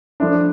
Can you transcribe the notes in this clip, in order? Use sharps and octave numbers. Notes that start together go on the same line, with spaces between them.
F3 A3 D4 E4